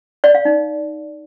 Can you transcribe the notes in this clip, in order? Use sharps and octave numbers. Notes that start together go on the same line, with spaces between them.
D5
F5
D#4